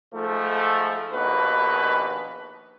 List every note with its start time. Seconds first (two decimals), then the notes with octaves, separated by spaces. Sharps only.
0.13 G#2 F3 A3
1.12 A#1 D#2 B2 B4